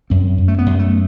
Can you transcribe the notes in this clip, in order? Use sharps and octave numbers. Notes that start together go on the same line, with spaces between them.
F#2 C4
F#2
A3
B3
F#2
A3